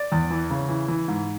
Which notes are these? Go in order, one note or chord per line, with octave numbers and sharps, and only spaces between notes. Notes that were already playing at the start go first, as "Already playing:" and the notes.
Already playing: D5
E2
E3
C#3
E3
E3
G#2